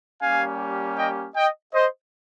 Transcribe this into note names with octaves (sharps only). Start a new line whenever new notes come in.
G3 A#3 C#4 G4 F5 G#5
D#5 G5
D#5 G5
C5 D#5